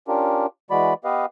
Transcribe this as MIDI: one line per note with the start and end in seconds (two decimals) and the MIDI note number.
0.08 0.46 61
0.08 0.46 62
0.08 0.46 65
0.08 0.46 67
0.08 0.46 70
0.70 0.94 52
0.70 0.94 56
0.70 0.94 66
0.70 0.94 74
0.70 0.94 83
1.05 1.26 59
1.05 1.26 67
1.05 1.26 71
1.05 1.26 75
1.05 1.26 77